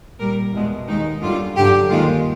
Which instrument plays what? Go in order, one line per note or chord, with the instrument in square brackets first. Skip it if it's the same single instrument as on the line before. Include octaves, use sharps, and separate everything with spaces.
[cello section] A#2 G3 A#4
E2 B2 G#3
D#2 D#3 G#3 D#4
F#2 D3 G3 F4
G2 D3 F#3 G4
D#2 D#3 G#3 F4